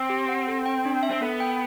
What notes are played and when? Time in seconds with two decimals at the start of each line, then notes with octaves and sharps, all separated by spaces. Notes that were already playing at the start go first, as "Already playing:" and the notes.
Already playing: C4
0.10 G4
0.29 F#5
0.48 A4
0.66 G5
0.85 D4
1.03 E5
1.11 C4
1.22 B3 A4
1.40 G5